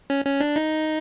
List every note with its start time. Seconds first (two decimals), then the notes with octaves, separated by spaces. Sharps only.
0.10 C#4
0.25 C#4
0.40 D4
0.56 D#4